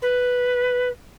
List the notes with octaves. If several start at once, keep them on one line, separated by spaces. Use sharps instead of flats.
B4